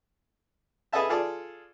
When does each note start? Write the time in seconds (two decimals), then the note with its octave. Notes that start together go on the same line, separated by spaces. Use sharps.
0.93 G#4 A4 B4 D#5 E5 A5
1.09 F4 G#4 A4 D5